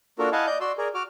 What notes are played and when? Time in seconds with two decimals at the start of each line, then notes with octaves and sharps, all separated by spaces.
0.19 A#3 D4 F4 F#4 A4 A#4
0.32 E4 D#5 F5 F#5 G#5 A5
0.47 D5 D#5 G6
0.61 F#4 D5 C6 E6
0.78 G#4 A#4 D5
0.94 F#4 D6 F6